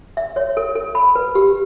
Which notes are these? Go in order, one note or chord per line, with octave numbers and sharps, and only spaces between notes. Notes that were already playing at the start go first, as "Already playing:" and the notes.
E5
C#5
A4
A4
B5
B4
G4